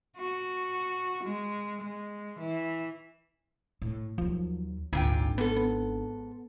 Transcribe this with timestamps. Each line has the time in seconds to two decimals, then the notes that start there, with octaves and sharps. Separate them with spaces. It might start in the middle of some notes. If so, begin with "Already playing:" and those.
0.17 F#4
1.23 G#3
1.81 G#3
2.39 E3
3.82 A2
4.18 D#2 F3 F#3
4.93 G#1 D2 A#2 D4 F4 G5
5.38 G#2 B3 A4
5.57 B3